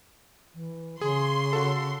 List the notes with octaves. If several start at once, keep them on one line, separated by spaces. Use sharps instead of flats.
E3
C#3 G#4 C6
F#4 A4